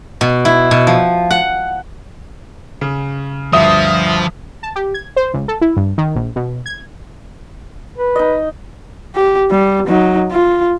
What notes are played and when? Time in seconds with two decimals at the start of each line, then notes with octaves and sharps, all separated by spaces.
0.21 B2
0.45 E4
0.71 B2
0.87 F3
1.31 F#5
2.81 C#3
3.53 D2 G2 F3 E5 D#6
4.63 A5
4.76 G4
4.94 G#6
5.16 C5
5.34 C#2
5.48 A4
5.61 E4
5.77 G2
5.98 D#3
6.16 A#1
6.36 B2
6.66 G#6
7.98 B4
8.16 D#4 D#5
9.15 G4
9.51 G3
9.87 F#3 D#4
10.32 F4